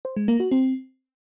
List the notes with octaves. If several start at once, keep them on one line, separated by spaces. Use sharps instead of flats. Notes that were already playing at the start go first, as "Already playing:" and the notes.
C5
G#3
A#3
F#4
C4